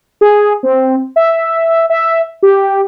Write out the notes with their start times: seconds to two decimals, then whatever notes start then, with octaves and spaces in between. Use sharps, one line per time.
0.21 G#4
0.63 C4
1.16 E5
1.90 E5
2.43 G4